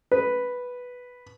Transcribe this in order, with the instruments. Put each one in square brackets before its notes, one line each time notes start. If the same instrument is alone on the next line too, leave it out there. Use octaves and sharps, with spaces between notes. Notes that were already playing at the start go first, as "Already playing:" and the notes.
[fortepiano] B4